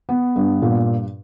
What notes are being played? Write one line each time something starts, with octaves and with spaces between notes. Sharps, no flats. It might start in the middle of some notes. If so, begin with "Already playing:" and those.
B3
G2
A#2